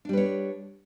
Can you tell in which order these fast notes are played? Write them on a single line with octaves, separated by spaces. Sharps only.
D4 G3 B4 C#5